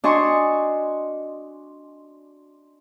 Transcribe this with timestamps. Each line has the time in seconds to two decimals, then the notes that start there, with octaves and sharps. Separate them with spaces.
0.04 D4 F#4 D#5 G#5 C6 C#6